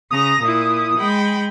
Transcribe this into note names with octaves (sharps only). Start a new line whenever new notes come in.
C#3 A#5 D#6 A#6
A#2 E4
G#3 G5 B5